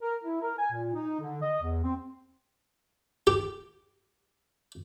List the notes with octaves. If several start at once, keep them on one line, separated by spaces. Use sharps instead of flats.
A#4
E4
A#4
G#5
A#2
D#4
D3
D#5
E2
C4
G4